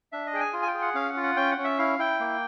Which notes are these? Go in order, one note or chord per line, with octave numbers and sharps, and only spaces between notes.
D4 E5
D#5
G#4 G5
G#5
F4
G#5
G5
G#4
F#5
C#4 F5
F#5
F4
F#5
C#4 G5
F#5
C#4
E5
E4 F5
E4 G5
A#3